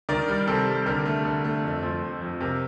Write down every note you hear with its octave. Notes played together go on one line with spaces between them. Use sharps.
D#3 A#4 D5
G3
C3 A4
G3
D3 G4 A#4
A3
D3
A3
F2
F3
F2
F2
C3 G4 A#4